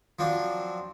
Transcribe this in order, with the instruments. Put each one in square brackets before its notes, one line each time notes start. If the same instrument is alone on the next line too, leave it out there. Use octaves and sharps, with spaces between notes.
[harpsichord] F3 F#3 C4 D4